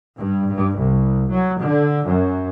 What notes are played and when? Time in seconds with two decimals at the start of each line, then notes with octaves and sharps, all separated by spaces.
0.19 G2
0.52 G2
0.82 C2
1.32 F#3
1.63 D3
2.06 F#2